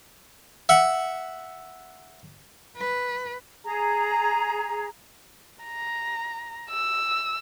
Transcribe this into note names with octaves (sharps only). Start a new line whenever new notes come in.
E5 F#5
B4
G#4 A#5
A#5
E6